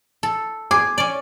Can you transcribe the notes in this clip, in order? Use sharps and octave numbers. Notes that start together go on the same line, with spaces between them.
A4
G#4 D6
C#4 D5